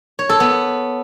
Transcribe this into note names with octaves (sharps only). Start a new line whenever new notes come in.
C#5
A4
B3